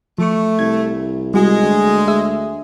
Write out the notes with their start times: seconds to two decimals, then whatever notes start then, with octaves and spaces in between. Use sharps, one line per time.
0.18 F3 A3 C#6
0.59 C2 G#6
1.34 G3 G#3 F#4
1.63 D2
2.08 G#4 E5